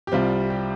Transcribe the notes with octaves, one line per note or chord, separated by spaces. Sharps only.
G4
C2 C3 G3 C4 F4
G4